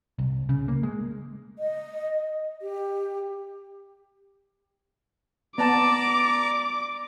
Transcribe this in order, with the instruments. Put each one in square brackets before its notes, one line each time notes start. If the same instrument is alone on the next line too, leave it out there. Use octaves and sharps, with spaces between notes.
[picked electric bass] C2
C#3
A#3
G#3
[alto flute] D#5
G4
[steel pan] B3 A5 [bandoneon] D5 A#5 [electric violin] D6